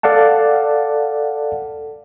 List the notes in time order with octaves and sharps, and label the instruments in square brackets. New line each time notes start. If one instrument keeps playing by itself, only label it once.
[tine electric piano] A4 D5 F5 F#5 A5